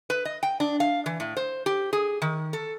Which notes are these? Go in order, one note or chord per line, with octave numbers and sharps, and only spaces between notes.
B4
D#5
G5
D4
F5
E3
A2
C5
G4
G#4
D#3
A4